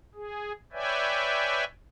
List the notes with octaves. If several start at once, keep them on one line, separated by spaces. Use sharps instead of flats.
G#4
B4 C#5 D5 E5 G5 G#5